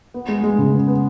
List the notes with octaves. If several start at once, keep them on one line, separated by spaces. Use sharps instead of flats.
B3
G#3
G#3
C#3
B3
B3